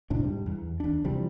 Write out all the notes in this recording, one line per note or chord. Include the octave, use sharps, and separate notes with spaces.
A2 C3 D4
G#2 G3
E2
D#2 D4
C3 E3 F3 G3